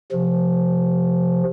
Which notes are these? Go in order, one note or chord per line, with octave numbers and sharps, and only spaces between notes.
C3 F3